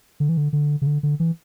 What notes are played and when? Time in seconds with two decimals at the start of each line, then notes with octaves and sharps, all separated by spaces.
0.20 D3
0.29 E3
0.37 D3
0.53 D3
0.82 C#3
0.87 D3
1.03 D3
1.20 E3